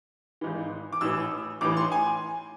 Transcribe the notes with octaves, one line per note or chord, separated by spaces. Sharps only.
G#1 G#2 E3
D6
A1 A2 E3 E6
A1 A2 E3 D6
C6
G#5